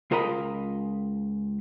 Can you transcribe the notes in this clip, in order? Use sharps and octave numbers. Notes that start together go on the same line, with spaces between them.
C#2 F4 A#4 D#5 A#5 B5